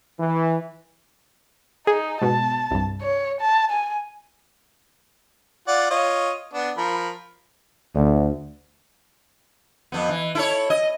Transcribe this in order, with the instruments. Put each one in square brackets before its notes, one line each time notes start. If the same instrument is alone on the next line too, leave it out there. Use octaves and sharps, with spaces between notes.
[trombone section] E3
[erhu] D#4 [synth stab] G#4
[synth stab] G#2 B2 [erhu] A5
[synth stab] C2 G2
[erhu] C#5
A5
G#5
[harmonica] F4 D5 F#5
F4 C#5 D#5
B3 D4
F3 A#4 B5
[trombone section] D2
[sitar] F2 B3
E3
E4 A4 C#5
D#5